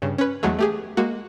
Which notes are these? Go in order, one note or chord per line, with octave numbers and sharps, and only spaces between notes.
G2 C#3
C#4 B4
E2 F#3 G#3 A3
A3 G4 G#4
G#3 A#3 F#4